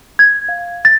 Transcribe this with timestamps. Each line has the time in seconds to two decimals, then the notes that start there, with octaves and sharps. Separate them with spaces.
0.19 G#6
0.49 F5
0.85 A6